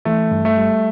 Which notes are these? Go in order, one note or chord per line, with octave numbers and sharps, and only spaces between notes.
E3 A3
G2
A3
G3